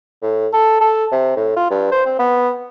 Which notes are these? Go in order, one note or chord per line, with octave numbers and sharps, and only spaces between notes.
A2
A4
A4
C3
A2
F4
G2
C5
C4
B3